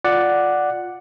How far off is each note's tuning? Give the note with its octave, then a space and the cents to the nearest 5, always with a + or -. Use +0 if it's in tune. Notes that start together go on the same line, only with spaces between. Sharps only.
F4 +15 D5 +0 F#5 +0